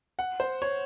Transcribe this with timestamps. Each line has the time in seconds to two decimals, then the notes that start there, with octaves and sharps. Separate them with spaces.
0.19 F#5
0.40 C5
0.62 C#5